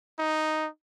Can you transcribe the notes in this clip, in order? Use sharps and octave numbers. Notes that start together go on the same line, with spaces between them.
D#4